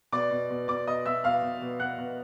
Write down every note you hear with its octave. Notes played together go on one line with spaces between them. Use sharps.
B2 D5 D6
B2
B2
B2 D5 D6
B2 D#5 D#6
B2 E5 E6
B2 F5 F6
B2
B2
B2 F#5 F#6
B2